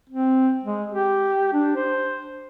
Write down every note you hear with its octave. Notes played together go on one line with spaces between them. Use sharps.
C4
G#3
G4
D4
C5